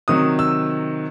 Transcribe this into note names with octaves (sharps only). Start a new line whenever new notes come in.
C3 D#3 F#3 D#6
E6